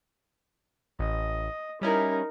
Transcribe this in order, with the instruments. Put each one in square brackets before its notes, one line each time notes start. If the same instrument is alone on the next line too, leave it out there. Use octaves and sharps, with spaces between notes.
[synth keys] A1 [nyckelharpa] D#5
[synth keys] G3 C#4 E4 [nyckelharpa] D#4 A#4